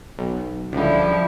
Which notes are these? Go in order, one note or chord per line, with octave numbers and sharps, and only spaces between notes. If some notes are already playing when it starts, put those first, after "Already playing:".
B1
C#2 D3 F3 G3 E4